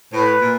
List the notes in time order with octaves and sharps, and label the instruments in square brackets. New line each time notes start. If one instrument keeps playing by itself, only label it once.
[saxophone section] A2 [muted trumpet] B4
[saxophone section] A#2